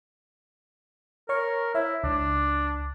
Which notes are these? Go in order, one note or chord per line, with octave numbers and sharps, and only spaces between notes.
A#4 C#5 C#6
E4 C#5 E5
C#2 D4